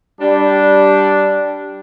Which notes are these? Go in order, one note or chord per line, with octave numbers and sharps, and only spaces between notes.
G3 D4